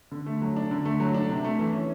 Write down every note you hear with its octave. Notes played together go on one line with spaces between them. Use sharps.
D3
A3
F#3
D4
D3
A3
F#3
D4
C3
A3
E3
C#4